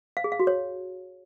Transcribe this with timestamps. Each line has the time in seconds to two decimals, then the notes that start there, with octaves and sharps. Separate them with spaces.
0.17 F5
0.24 G#4
0.32 F5
0.40 F#4
0.47 C#5